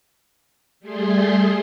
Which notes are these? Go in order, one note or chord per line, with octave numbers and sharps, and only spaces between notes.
G3 A3 G#4 C6